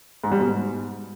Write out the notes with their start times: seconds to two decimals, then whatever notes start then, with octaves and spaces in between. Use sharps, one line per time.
0.24 G#2
0.32 G3
0.40 B2
0.48 G#2